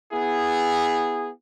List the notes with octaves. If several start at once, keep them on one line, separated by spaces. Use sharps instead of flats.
B3 E4 G#4